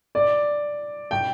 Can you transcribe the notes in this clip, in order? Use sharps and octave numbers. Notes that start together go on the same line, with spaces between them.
D5
G5